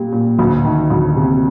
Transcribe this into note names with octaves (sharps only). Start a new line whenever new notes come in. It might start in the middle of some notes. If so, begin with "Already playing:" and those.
Already playing: A#2 G3
A#2
D2
D#3
D2
C3